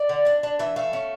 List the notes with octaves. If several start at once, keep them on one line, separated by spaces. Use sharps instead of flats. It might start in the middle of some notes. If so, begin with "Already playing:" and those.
Already playing: D5
D3
D4
D4
E3 E5
A3 F5
C#4